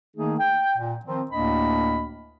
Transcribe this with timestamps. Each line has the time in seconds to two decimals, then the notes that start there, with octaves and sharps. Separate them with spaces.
0.17 D#3 A3 A#3 D#4 G#4
0.39 G5
0.78 A#2
1.06 D#3 F3 C4
1.32 D2 A2 A#3 D4 D#5 B5